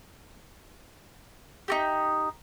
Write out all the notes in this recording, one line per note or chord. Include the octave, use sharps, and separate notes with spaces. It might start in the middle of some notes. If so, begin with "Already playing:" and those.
D#4 F#4 G4